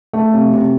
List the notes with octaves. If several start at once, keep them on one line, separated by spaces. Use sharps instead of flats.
A3
C3
C3